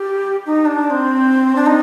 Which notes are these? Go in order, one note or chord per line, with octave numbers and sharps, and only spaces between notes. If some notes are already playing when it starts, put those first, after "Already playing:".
Already playing: G4
D#4
D4
D4
C4
D4
D#4